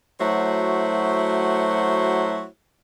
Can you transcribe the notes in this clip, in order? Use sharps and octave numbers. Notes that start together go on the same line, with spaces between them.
F#3 A3 E4 F#4 C5 C#5